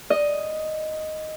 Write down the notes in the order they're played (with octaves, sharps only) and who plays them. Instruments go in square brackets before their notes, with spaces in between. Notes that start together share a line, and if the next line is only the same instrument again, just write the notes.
[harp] D#5